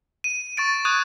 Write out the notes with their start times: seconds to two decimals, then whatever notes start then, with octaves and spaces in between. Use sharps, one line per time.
0.24 D#7
0.57 C#6 A6 D7
0.85 C#6 D#6 F#6 G#6 D#7